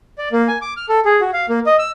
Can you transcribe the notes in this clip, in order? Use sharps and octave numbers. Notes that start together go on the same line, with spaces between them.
D5
A#3
G#5
D6
F6
A4
G#4
F#4
F5
A#3
D#5
E6